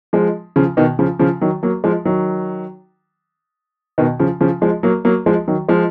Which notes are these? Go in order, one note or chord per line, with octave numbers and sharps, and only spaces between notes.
F3 G#3
C#3 F3
B2 D#3
C#3 F3
C#3 F3
D#3 F#3
F#3 A#3
F3 G#3
D#3 F#3
B2 D#3
C#3 F3
C#3 F3
F3 G#3
F#3 A#3
F#3 A#3
F3 G#3
D#3 F#3
F3 G#3